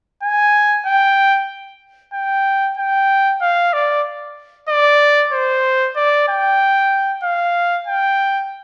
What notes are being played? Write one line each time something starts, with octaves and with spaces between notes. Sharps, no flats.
G#5
G5
G5
G5
F5
D5
D5
C5
D5
G5
F5
G5